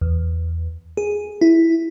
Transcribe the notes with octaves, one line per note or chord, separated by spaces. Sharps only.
E2
G#4
E4